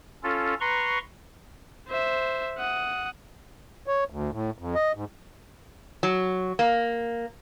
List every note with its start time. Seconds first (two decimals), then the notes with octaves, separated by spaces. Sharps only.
0.23 C#4 F4 A4
0.60 B4 A#5 C6 C#6
1.88 C5 E5
2.58 F#5 D#6
3.87 C#5
4.10 D2
4.32 A2
4.59 F2
4.75 D#5
4.95 G#2
6.03 F#3
6.59 A#3